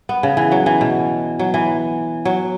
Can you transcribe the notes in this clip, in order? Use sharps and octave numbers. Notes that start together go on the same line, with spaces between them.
B3
C#3
E3
F#3
E3
B2
F#3
E3
F#3